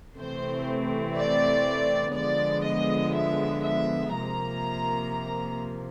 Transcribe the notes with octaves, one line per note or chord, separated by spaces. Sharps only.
C3 E3 A3 C4 C5
D5
D3 F3 G#3 B3 D5
D#5
E5
E5
C3 F3 A#3 A#5